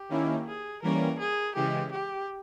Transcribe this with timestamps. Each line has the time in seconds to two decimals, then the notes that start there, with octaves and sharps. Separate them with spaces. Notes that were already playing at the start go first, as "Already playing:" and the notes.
Already playing: G4
0.09 D#3 A#3 C#4 E4
0.47 G#4
0.82 E3 G3 A#3 C#4 A#4
1.19 G#4
1.55 C#3 E3 G#3 G4
1.92 G4